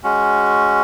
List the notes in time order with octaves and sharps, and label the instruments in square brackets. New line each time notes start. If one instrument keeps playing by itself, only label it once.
[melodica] G#3 C#4 F#4